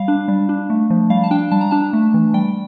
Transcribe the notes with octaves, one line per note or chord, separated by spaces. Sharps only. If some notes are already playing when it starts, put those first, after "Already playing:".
Already playing: G3 F5
D4
G3
D4
A3
F3
G3 F5
A5
D4 G5
G3 A5
A#5
D4 A5
A3
E3
G3 G5